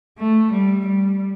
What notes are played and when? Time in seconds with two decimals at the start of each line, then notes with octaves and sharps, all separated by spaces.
0.18 A3
0.52 G3
0.87 G3